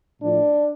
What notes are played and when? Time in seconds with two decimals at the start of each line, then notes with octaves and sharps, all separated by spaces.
0.21 A2 F3 A3 D4